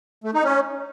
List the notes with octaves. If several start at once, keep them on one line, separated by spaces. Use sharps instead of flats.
A3
D#4
C#4